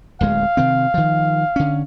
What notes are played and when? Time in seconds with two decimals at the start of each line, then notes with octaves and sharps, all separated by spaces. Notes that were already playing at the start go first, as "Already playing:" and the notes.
0.21 D1 D#2 G#3 F5
0.57 C3 D#3 C4
0.94 D#3 F3
1.56 D3 C#4